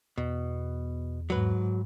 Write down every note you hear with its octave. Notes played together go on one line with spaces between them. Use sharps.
E2 B2
G#2 F#3 B4